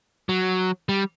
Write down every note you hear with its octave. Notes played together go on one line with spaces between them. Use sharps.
F#3
G3